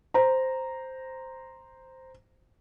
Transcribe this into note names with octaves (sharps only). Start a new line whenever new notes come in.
C5 A#5